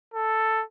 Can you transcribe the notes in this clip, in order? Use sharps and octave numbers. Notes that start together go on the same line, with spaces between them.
A4